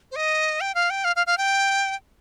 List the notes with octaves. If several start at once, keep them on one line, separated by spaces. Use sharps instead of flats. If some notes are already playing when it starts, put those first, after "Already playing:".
C5
D#5
G5
F5
G5
F5
F5
F5
G5